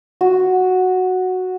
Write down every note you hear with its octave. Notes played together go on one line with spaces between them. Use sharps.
F#4